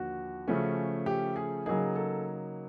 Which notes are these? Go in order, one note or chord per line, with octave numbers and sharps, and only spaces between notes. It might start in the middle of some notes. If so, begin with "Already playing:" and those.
Already playing: D#2 D3 F3 F#4
C#3 F3 A3 C#4
G4
G#4
C#3 F#3 A#3 D#4 G#4
A4